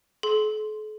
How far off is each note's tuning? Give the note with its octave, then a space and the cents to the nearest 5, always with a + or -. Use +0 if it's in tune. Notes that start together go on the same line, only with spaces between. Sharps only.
A4 -45 C6 +0